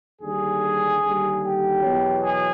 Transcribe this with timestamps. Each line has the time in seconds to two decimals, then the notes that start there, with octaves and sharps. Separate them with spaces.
0.21 D#2 D3 G3 G#4
1.02 D#2 D3 G3
1.42 G4
1.82 E2 B2 F#3
2.22 G#4